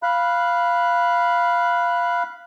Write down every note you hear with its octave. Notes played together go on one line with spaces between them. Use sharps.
F5 B5 F#6